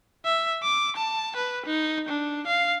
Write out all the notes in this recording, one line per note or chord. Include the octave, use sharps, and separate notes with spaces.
E5
D6
A5
B4
D#4
D4
F5